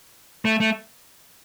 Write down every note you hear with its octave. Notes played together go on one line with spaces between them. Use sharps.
A3
A3